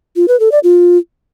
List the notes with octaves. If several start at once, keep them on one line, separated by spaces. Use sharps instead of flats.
F4
B4
A4
D5
F4